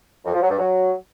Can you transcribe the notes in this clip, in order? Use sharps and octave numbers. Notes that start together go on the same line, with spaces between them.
F2
F3
F#3
G2
F#3